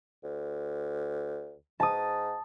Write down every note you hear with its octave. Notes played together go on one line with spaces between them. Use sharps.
D2
G#2 A5 D#6